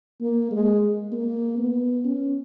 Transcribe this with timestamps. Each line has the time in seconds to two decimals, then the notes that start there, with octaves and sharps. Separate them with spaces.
0.21 A#3
0.51 G#3
1.12 A#3
1.58 B3
2.04 C#4